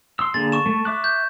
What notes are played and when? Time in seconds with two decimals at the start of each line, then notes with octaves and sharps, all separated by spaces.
0.19 C6 E6
0.34 D3 A#3 G#4 A6
0.52 C#6 E7
0.66 A3
0.85 E5 D6 F#6
1.04 G6